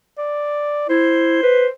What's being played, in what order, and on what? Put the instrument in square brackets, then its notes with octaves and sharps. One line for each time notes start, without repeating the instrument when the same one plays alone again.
[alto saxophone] D5
[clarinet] E4 [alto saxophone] C5
[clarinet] B4